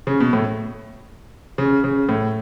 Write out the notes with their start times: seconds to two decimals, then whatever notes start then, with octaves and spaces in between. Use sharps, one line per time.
0.07 C#3
0.20 B2
0.33 A2
1.58 C#3
1.84 C#3
2.09 A2